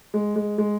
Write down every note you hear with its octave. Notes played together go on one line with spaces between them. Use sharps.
G#3
G#3
G#3